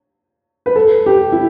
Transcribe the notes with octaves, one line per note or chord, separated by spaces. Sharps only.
B4
A4
G4
E4